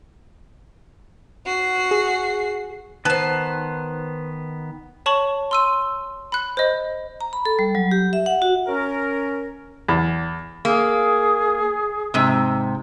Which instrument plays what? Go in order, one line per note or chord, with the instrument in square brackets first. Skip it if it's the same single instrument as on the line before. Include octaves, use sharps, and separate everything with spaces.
[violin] F#4 C7
[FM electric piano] G#4
[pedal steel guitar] D#3 B3 A5 [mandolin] B4 C5
[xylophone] C#5 A5 C#6 F#7
C6 E6 D#7
B5 F#6
C5 D#5
[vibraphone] A#5
B5
A4
G3
F#3
G4
E5
F#5
F#4
[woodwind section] C#4 A#4
[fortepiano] E2
[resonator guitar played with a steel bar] A#3 [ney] G#4
[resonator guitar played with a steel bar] G#2 C3